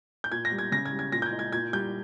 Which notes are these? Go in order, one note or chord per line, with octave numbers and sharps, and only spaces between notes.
G6
A#2 G#6
A#6
G3
G#6
C#3 A#6
G#6
G3
G#6
A#2 A#6
G6
G#6
G#3
G#6
A#2 G#6
G3 G6